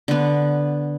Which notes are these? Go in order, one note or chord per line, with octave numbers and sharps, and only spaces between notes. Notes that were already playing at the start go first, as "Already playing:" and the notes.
D3 B3